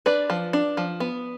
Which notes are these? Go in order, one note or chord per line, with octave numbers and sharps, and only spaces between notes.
D4 B4 D5
F3
D4
F3
B3